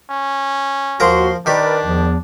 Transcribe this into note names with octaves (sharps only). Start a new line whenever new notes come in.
C#4
D#2 F3 F#4 A#4 A#5 C6
D#3 D4 G4 A#4 B4 D5
E2 F3